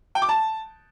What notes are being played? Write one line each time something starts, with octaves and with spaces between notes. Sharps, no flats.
G5
D6
A5